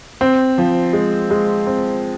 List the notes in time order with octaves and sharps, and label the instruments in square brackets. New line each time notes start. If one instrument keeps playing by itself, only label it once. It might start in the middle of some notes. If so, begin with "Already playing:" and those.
[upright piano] C4
F3
G#3
G#3
C4